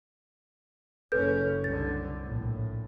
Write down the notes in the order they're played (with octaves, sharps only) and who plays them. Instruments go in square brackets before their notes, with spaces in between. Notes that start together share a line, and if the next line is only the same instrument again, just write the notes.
[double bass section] F#1 C#3 C#4 [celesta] A4 B4 G6
[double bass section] C2 D3 [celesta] A6
[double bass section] A#1 A2